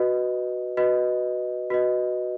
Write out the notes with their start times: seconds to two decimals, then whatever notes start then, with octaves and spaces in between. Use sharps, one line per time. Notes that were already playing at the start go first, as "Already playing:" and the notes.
Already playing: F#4 B4 D#5
0.77 F#4 B4 D#5
1.70 F#4 B4 D#5